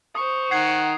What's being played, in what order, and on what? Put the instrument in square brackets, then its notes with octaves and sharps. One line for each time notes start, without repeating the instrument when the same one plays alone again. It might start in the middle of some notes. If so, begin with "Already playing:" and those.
[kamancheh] C5 C#6 [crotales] D#6
[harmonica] D#3 F#5 [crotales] G#6 C7